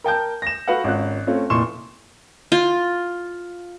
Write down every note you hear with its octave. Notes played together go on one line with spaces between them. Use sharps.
A#4 G5 A5 G6
A#6 E7
F#4 A4 B4 F5 F#5
G#1 C#4 F4 F#6
A3 C4 C#4 F4
F1 A#2 E4 C6 C#6 E7
F4